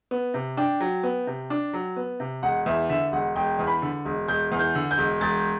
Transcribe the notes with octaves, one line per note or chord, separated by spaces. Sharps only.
B3
C3
D4 G5
F#3
B3
C3
D4
F#3
B3
C3
E1 F#5
E2 E5
D3 E5
E1 F#5
E1 G5
E2
B5
D3
E1
E1 G6
E2
G6
D3
G6
E1
E1 A6